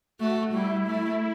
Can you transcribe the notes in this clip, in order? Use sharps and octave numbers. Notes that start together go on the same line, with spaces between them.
A3 F#4
G3 E4
A3